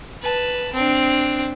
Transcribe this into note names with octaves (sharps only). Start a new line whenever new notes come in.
B4 A5
C4 D4